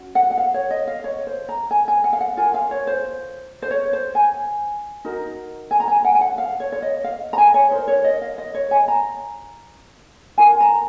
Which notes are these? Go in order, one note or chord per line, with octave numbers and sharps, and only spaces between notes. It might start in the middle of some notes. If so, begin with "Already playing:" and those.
Already playing: C#4 F#4
F#5
F#5
F5
C#5
D#5
F5
C#5
C5
A#5
G#5
G#5
F#5
F5
F#5
F4 A#4 G#5
F5
C#5
C5
C5
C#5
C5
G#5
D#4 F#4 A#4
G#5
A#5
G#5
F#5
G#5
F#5
F5
C#5
C#5
D#5
F5
A#5
G#5
C#5
D#4 A#4 C5
C#5
D#5
F5
D#5
C#5
G#5
A#5
F4 A#4 G#5
A#5